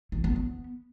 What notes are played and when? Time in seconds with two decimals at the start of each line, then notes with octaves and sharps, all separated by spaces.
0.12 E3
0.24 B3
0.36 B3